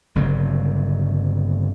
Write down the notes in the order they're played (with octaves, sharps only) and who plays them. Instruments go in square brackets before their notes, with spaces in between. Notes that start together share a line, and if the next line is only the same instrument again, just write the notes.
[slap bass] G1 C#3 F#3 G3